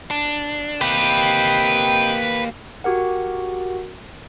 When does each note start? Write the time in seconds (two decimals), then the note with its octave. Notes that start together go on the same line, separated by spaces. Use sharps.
0.11 D4
0.81 C3 A#3 G4 B4 D#5 G5
2.84 F#4 G4 A#4 F#5